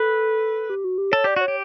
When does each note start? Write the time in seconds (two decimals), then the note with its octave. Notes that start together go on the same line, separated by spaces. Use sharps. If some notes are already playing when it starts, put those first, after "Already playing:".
Already playing: A4 B4
0.70 G4
0.84 F#4
0.98 G4
1.12 A4 C#5
1.24 G4 D5
1.36 F#4 C#5
1.48 G4